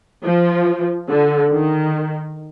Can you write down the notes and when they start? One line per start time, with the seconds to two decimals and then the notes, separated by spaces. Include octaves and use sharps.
0.23 F3
1.09 D3
1.52 D#3